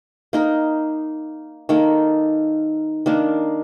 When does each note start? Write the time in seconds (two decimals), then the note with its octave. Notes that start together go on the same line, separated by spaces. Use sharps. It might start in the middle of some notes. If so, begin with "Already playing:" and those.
0.33 A#3 D#4 A#4
1.69 D#3 A#3 D#4 A4
3.06 D#3 A#3 D4